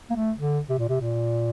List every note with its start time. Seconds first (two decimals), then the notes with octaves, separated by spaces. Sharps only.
0.10 A#3
0.15 A3
0.38 D3
0.69 C3
0.78 A#2
0.89 C3
1.00 A#2